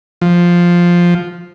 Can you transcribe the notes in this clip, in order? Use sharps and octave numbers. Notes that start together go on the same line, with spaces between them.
F3